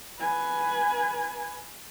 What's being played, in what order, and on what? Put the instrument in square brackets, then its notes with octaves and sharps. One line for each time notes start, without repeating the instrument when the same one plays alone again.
[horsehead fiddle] B4 G#5